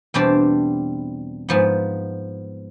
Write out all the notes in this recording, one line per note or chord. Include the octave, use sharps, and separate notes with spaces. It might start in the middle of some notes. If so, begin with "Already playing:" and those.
E2 B2 G3 C4 D4 A5
G#2 F3 B3